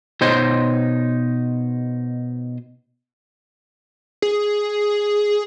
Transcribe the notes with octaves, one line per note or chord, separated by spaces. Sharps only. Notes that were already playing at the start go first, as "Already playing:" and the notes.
B2 D#4 C5 C#5 D#5 C6
G#4